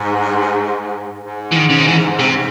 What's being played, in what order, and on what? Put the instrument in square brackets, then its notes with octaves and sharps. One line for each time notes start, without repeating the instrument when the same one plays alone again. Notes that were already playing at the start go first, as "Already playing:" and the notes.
Already playing: [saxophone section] G#2
G#2
[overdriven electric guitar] E3
D#3
C#3
D#3
E3
C3